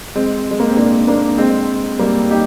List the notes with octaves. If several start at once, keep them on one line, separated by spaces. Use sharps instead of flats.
G#3 C4
G#3
A#3
C4
A#3 D4
A#3 D4
G#3 C4
G3 A#3
D#4 G4